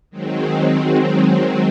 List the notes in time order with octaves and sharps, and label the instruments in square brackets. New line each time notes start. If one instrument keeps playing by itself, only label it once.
[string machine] D#3 F#3 G#3 C4